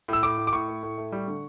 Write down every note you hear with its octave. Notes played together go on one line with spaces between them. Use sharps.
A2 E6
A2 D6
A2
D6
A2 C#6
A3
A2
A3
G3
D3